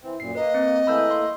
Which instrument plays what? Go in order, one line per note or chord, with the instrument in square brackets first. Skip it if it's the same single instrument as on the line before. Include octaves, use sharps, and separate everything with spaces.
[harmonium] E3 C4
[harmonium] F#2 A#2 [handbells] C7
[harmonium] A#3 [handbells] B4 [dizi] D#5
[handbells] C4
[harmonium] E3 A3 A#3 [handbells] B5 E6 G6
[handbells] C6